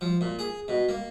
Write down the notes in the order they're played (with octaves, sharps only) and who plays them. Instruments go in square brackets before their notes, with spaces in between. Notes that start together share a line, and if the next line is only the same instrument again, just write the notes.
[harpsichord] F3
A#2
G#4
B2
A#3